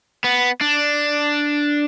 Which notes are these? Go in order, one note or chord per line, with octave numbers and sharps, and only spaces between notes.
B3
D4